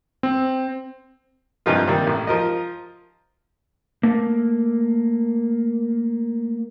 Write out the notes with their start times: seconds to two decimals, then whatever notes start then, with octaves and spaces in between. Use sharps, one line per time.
0.23 C4
1.66 G2 C3 E3 F3 D#4 F4
1.87 C3 D#3 G3 A#3
2.07 A1
2.27 F3 A#4 D#5
4.03 A3 A#3